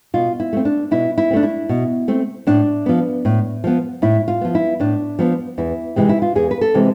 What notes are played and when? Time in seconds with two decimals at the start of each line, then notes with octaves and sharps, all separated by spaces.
0.14 B2 F4
0.40 E4
0.53 A3 C4
0.65 D4
0.91 B2 E4
1.18 E4
1.31 C4
1.33 A3 D4
1.43 E4
1.69 B2
2.08 A3 C4
2.47 A2 D4
2.86 F3 B3
3.25 A2
3.64 F3 B3
4.02 A2 E4
4.28 F4
4.41 F3 B3
4.55 E4
4.80 A2 D4
5.19 F3 B3
5.58 E2 E4
5.96 C3 E3 G#3 C4
6.09 E4
6.22 F4
6.35 E2 G#4
6.51 B4
6.61 A4
6.74 C3 E3 G#3 C4